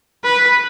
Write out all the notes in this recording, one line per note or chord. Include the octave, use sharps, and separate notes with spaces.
B4